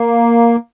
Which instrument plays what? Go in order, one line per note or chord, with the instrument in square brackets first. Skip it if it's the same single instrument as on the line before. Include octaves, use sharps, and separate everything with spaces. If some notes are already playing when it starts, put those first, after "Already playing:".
Already playing: [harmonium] A#3